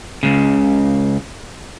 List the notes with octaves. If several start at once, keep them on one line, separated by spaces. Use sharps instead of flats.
C#2 C#3